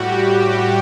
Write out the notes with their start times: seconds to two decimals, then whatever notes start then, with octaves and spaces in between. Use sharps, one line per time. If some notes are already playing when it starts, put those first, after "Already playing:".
Already playing: A2 G3 F#4 G4
0.19 F#4